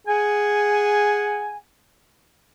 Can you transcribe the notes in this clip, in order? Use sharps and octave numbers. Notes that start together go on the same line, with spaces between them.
G#4 F#5 G#5